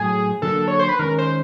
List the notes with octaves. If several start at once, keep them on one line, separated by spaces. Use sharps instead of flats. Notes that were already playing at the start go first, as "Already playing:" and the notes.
Already playing: A2 F#3 A3 G#4
D3 F#3 A#3 D4 A4
C#5
C5
B4
D#3 G#3 C#4 A#4
C5